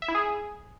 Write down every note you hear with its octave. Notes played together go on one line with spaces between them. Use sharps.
E5
E4
G#4